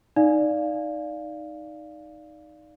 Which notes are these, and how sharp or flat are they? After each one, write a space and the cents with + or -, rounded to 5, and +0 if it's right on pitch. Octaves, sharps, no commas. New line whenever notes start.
D#4 +0 D5 +0 F5 +0